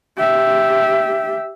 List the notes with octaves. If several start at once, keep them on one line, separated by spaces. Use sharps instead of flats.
G4 E5